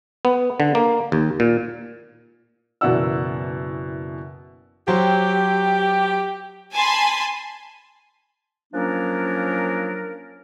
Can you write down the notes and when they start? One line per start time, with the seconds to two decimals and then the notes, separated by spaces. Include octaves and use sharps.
0.25 B3
0.60 D3
0.75 A#3
1.12 D#2
1.40 A#2
2.81 F#1 B2 E3 D5 F#5 E6
4.88 F#3 G4 C5
6.72 G#5 A5 B5 C6
8.73 F3 F#3 A#3 C#4 D4 A#4